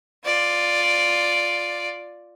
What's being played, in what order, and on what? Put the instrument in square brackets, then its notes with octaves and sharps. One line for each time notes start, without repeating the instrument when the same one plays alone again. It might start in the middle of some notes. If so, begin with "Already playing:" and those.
[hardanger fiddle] F4 D5